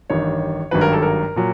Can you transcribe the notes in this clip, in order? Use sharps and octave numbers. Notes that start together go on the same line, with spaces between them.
A1 G2 D#3 C#5
G#1 G2 D#3 F#3 B4
A#4
A4
A#4
A#2 F#3